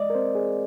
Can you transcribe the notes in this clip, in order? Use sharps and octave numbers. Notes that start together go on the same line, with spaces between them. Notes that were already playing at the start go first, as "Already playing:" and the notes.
Already playing: G#3 D5 D#5
A#4
C4 C5
G#4